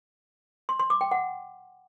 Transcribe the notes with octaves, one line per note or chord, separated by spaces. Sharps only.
C6
C6
D6
G5
F#5